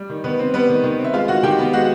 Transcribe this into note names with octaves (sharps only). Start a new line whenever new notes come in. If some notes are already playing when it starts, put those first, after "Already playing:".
Already playing: G3
D#3
D#3 B3 B4
C4
G3 B3 B4
D#3
D#3
C4
E5
G#3 F4 F5
D#3 F#4 F#5
D#3 G4 G5
B3
G#3 F#4 F#5